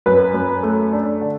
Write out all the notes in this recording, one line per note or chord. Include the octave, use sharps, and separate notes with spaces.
F#2 B4
F#2
A3
D4
D3